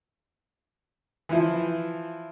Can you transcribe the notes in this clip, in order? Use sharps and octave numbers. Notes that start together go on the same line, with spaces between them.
E3 F3 E4